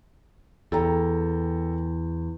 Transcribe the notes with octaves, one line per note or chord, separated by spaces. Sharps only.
E2 A4 G5 A#5